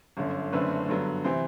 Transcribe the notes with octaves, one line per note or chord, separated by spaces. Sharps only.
G1 F#2 D3
F#1 F#2 D3 A3 C4 B4
G2 D3 F#3 B3
C3 E3 C5